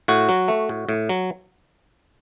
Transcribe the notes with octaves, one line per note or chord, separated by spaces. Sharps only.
A2 F#4
F#3
A3
A2
A2
F#3